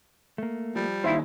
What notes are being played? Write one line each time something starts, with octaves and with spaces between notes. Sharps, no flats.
A3 A#3
F3 G3
D#2 D#3 E4 F4 C5